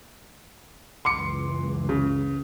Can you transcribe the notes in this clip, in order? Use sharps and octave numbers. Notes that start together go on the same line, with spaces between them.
F#1 C#2 E3 C6 D6 C#7
C#3